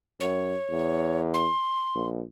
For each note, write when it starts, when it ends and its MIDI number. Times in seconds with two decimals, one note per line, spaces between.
0.20 0.55 42
0.20 1.19 73
0.70 1.48 40
1.34 2.06 84
1.95 2.22 34